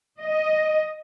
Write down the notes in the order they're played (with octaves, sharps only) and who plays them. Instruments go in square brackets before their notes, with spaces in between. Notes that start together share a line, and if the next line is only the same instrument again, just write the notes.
[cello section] D#5